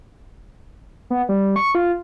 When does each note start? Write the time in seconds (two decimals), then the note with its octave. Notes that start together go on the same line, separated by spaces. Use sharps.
1.10 B3
1.29 G3
1.56 C#6
1.75 F4